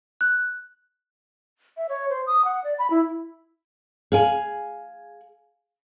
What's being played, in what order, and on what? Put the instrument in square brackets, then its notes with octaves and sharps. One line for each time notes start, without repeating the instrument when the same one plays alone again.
[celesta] F#6
[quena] E5
C#5
C5
D#6
F#5
D5
B5
E4
[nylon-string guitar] G#4 F5 G#5